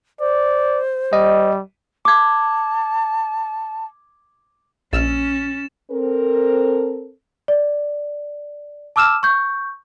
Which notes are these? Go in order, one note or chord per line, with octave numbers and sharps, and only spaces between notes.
C5 D5
G3 D#5
A5 D6 G#6
A#1 C#4 E6 F6 A6 E7
C4 A4 A#4
D5
A5 D6 E6 F6 E7
C#6 G6